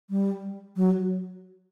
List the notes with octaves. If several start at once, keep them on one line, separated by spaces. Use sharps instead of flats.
G3
F#3